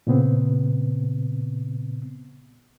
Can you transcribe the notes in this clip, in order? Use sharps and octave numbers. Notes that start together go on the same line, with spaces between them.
A#2 C#3 B3 C4